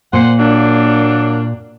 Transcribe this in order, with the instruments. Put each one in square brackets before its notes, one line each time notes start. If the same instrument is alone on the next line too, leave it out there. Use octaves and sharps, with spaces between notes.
[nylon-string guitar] A#2 [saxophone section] C5 F#5
[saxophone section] F#3 A#3 D4